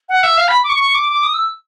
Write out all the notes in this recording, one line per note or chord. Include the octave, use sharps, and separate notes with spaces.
F#5
E5
F5
B5
D6
C#6
C#6
D6
D6
D#6
E6